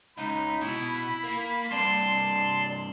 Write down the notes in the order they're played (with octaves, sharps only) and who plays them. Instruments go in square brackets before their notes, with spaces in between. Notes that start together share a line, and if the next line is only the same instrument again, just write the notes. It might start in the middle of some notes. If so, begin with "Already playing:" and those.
[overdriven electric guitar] C#2 [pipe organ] D#4 [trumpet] B5
[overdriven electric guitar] B2 [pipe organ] E4
[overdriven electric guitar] A#3
[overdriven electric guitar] G2 C3 [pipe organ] D5 A5 [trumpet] C6